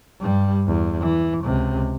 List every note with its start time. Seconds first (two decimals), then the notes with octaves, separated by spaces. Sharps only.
0.20 G2 G3
0.67 E2
1.01 E3
1.44 C#2 C3